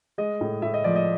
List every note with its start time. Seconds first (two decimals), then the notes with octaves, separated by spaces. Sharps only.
0.18 G#3 D#5
0.41 A2
0.62 A2 E5
0.74 D#5
0.84 F3 D5
0.96 D#5